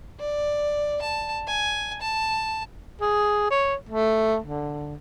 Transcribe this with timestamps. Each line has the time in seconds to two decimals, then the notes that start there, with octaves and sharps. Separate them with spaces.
0.20 D5
1.02 A5
1.47 G#5
2.01 A5
3.01 G#4
3.51 C#5
3.89 A3
4.44 D3